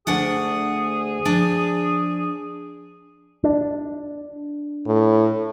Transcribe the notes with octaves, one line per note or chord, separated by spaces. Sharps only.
D2 D4 G#4 F#5
F3 D4
D4
A2